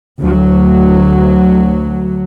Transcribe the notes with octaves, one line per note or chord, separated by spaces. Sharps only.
D2 F#3